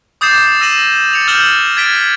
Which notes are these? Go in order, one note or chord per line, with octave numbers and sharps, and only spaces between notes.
D6 D#6 G6 A6 C7 E7
E6 A#6 D#7 E7 F#7
A6 C#7 F7
E6 F6 G6 E7 F#7 G7
G#6 A6 B6 D7 G7